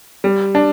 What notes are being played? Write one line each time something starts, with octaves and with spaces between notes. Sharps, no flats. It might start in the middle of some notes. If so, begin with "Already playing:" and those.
G3
D4